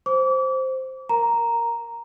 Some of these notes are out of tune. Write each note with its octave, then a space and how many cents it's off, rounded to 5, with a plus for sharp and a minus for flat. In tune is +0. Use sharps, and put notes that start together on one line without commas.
C5 +0 D6 -35
A#4 +0 A#5 +0